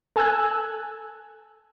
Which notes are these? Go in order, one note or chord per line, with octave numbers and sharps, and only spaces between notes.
A4 G#5 A5 E6 F#6 G#6